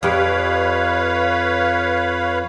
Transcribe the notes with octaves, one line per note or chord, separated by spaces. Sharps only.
F2 G4 B4 C#5 F5